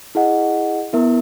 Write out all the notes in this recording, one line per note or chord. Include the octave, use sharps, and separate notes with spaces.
E4 G#4 D#5 F#5
B3 E4 A#4 E5